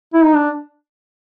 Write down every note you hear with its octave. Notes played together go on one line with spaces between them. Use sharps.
E4
D#4
D4